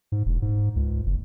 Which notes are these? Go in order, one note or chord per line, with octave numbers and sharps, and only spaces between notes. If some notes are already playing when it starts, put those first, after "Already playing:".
G#2
E1
G#2
C#2
F#1